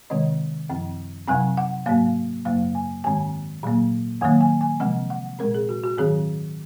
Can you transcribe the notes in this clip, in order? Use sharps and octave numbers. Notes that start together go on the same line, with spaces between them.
C3 D#3 G#3 C4 D#5
F#2 F3 C4
F2 C3 F#3 C4 G#5
F#5
G#2 F#3 A#3 F5
F#2 C#3 F#3 A#3 F5
G#5
G#2 D#3 G#3 C4 G#5
A#2 F#3 A#3
F2 D#3 F#3 A#3 G#5
G#5
G#5
C3 F3 G#3 C4 F#5
F#5
A#2 G#3 C4 A#4
G#4
F#4
F#4
G#2 D#3 F#3 C4 G#4